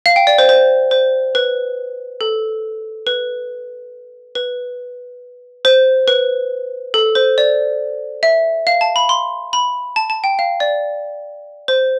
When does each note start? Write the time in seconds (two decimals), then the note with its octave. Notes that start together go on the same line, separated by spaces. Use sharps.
0.06 F5
0.16 G5
0.27 D5
0.38 C5
0.49 C5
0.91 C5
1.35 B4
2.21 A4
3.07 B4
4.35 B4
5.65 C5
6.08 B4
6.94 A4
7.15 C5
7.38 D5
8.23 E5
8.67 F5
8.81 A5
8.96 B5
9.09 C6
9.53 B5
9.96 A5
10.10 A5
10.24 G5
10.39 F5
10.60 D5
11.68 C5